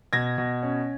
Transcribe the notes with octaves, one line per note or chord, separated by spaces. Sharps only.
B2 G#6 A#6
B2
C#4